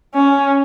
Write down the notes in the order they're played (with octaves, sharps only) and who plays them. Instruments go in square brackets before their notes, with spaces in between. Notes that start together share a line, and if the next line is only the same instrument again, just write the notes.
[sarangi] C#4